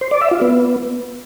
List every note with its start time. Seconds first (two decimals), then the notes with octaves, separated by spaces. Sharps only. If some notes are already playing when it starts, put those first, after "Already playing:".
0.01 C5
0.11 D5
0.21 E5
0.31 F4
0.41 B3